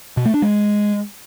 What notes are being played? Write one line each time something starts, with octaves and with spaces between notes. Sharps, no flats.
B2
A3
D4
G#3